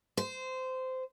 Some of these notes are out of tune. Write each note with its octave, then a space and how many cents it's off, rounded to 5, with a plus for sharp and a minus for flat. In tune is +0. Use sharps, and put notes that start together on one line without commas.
C5 -20